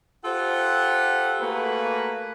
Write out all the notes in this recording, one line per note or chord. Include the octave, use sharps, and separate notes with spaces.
F4 G4 A4 C5 F#5
A3 A#3 F#4 G#4 A#4 B4